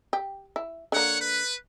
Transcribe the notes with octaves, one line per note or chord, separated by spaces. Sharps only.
G4
E4
D3 A#3 C#5 F#5
B4